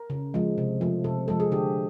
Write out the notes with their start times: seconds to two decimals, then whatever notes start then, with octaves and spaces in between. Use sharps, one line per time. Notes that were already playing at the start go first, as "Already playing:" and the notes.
Already playing: A#4
0.10 C#3
0.34 F3 G#3
0.58 C3
0.81 F3 A3
1.04 C3 A4
1.28 F3 G#3 A4
1.40 G#4
1.52 D3 G4